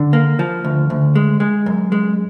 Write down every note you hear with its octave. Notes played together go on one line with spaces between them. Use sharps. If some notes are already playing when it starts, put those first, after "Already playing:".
Already playing: D3
A#3
F3
D2
D2
G#3
G#3
F#2
G#3